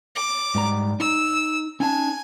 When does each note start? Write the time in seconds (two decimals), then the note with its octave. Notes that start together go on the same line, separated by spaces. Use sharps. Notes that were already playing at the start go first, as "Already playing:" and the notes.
0.16 D6
0.55 G#2 G3 A#5
1.00 D#4 E6
1.80 C#4 D#4 G#5 A5